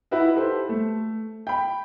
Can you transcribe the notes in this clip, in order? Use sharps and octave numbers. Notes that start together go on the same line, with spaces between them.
D#4 E4 F#4 B4 E5
G4 A4 B4 C5
A3
G5 B5